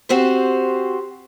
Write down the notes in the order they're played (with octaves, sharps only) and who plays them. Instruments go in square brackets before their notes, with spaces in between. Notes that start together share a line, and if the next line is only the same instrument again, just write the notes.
[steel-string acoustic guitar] C4 F#4 G4 C5